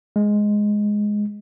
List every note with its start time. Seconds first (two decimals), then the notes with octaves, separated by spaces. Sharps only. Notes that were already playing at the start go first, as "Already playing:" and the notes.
0.16 G#3